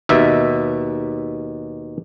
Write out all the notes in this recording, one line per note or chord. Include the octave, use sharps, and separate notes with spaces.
D#2 B2 E5